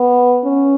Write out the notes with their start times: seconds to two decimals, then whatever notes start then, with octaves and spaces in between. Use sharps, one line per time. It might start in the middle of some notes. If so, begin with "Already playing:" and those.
Already playing: B3
0.44 C#4